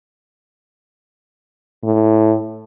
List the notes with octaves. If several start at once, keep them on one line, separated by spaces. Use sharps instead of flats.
A2